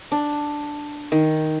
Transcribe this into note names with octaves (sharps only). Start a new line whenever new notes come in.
D4
D#3